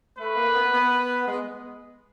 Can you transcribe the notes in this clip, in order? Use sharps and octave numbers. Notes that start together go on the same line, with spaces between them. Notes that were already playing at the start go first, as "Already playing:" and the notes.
A3 B4
A#3
B3
B3
G#3